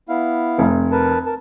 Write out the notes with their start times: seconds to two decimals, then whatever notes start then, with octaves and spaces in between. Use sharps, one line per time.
0.09 B3 E4 F5
0.58 F1
0.92 A#4 B4 A5
1.26 A#4 A5